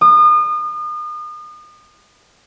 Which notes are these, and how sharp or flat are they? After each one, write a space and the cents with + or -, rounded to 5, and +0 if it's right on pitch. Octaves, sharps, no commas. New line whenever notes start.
D#6 -35